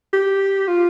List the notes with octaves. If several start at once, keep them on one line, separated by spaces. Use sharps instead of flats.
G4
F4